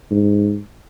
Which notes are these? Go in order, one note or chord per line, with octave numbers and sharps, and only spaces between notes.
G#2